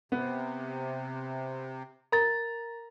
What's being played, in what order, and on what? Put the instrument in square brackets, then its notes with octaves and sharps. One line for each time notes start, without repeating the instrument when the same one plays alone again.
[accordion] C3 [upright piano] B3
[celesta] A#4 A6 [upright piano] A#5